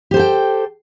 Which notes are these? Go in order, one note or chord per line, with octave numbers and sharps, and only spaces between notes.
G4 A4 C5 G5